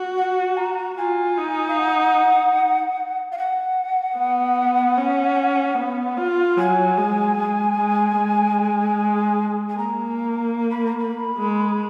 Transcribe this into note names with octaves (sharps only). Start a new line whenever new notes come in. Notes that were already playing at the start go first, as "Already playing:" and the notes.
Already playing: F#4
F#5
A#5
F4 G#5
D#4
F5
F#5
F5
F#5
B3
C#4
B3
F4
F#3 G#5
G#3
G#3
G#3
G#3
G#5
A#3 A#5
B5
A#5
B5
G#3